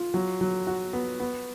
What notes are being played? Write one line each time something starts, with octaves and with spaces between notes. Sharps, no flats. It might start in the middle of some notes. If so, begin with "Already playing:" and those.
Already playing: F4
F#3
F#3
F#4
B3
B3